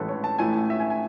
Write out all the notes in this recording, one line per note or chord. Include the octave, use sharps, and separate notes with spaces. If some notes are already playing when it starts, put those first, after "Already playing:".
Already playing: A1 A2 G#3 A4 B4
C#5
A5
A1 A2 E3 A3 G#5
E5
G#5
G#5